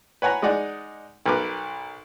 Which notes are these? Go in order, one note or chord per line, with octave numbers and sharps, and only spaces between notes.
B4 C#5 F#5 G#5 A#5
G#3 D#4 D5 F#5 G#5
B1 A#4 B4 D6